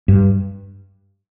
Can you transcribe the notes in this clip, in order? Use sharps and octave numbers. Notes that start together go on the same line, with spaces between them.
G2